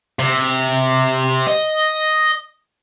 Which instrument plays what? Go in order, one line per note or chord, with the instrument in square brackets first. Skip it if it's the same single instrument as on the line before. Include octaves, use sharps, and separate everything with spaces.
[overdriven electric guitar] C3
D#5